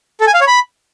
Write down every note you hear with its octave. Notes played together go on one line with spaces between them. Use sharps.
A4
G#5
F5
C#5
B5